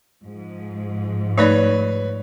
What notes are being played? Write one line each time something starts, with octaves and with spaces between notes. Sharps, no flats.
G#2 F3
A3 D#4 B4 C#5 D5